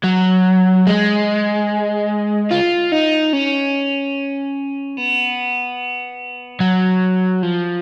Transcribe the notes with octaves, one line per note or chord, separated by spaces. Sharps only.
F#3
G#3
F4
D#4
C#4
B3
F#3
F3